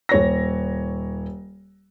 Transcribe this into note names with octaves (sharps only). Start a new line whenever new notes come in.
D#1 C#5 A#6